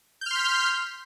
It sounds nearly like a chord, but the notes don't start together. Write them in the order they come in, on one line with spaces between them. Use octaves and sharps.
G6 F6 C6 B6